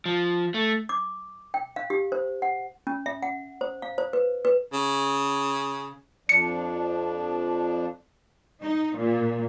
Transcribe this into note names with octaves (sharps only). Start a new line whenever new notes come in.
F3
A3
D6
G5
F5
G4
C5
F#5
C#4
E5
F#5
C5
F5
C5
B4
B4
C#3
F2 F3 D4 C#7
D#4
A#2